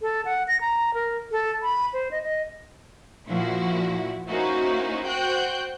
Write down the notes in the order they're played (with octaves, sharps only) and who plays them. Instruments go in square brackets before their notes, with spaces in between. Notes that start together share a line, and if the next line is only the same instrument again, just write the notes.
[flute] A4
F#5
A#6
A#5
A#4
A4
B5
C5
D#5
D#5
[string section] A#2 F3 E4 F#4
A#3 C#4 D#4 E4 F#4 C5
F#4 C5 G5 F#6 G6